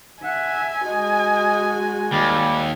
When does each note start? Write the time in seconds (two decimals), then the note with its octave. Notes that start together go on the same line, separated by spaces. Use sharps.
0.24 E5 F#5 G#5
0.86 G#3 F#4 D#5
2.11 D#2 G3